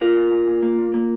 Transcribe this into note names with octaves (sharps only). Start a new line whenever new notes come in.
A#2 F4 A#4
A#2
A#2
A#2
A#3
A#2
A#3